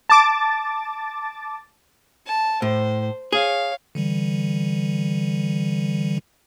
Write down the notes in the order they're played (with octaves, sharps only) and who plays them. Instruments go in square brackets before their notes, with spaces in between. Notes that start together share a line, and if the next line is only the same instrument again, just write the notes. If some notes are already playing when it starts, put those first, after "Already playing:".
[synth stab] A5 D6 A6
[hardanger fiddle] A5
[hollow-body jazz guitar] A2 [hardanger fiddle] C5
[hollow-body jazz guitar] G#4 [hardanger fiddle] C#5 F5
[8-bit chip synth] D3 E3 G3